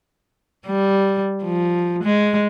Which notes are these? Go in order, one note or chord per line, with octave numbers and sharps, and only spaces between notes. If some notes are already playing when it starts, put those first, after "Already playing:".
G3
F3
G#3